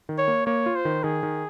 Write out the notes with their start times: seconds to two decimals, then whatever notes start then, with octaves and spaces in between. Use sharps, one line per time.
0.09 D#3
0.18 C#5
0.28 A#3
0.46 A#3 C#5
0.66 F4
0.75 C5
0.85 D#3
1.03 D#3 G#4
1.23 D#3